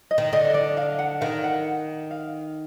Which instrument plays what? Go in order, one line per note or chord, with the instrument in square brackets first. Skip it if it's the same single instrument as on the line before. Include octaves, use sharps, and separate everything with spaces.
[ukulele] D#5
[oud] D#3
[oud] D3 [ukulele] D#5
[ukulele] D#5
D5
F5
F#5
[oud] D#3 [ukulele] F5
[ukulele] F#5
F5